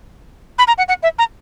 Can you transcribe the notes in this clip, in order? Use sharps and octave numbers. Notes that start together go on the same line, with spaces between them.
B5
A#5
F#5
F#5
E5
A#5